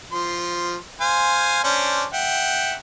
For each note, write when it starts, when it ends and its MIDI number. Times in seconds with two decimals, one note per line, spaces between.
0.12 0.76 53
0.12 0.76 84
1.01 1.60 72
1.01 1.60 77
1.01 1.60 80
1.64 2.05 61
1.64 2.05 62
1.64 2.05 72
2.13 2.75 76
2.13 2.75 78
2.13 2.75 79